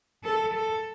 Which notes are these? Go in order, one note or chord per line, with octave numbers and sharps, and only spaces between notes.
A4
A4